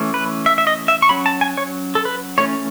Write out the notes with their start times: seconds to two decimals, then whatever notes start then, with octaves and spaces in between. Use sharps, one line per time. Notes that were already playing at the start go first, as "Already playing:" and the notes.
Already playing: E3 A3 C#4
0.14 B4
0.46 E5
0.58 E5
0.67 D#5
0.88 E5
1.02 C#6
1.09 F#3 C#4 B5
1.26 A5
1.41 G#5
1.57 C#5
1.95 A4
2.05 B4
2.38 E3 A3 C#4 C#5